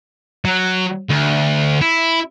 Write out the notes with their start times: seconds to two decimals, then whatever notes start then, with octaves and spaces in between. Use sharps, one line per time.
0.45 F#3
1.09 D2
1.81 E4